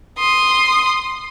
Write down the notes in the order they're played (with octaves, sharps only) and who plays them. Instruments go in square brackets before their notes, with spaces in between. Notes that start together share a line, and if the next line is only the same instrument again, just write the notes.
[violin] C6 D#6